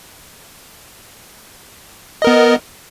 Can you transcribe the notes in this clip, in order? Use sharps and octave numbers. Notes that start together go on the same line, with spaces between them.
B3 A#4 D#5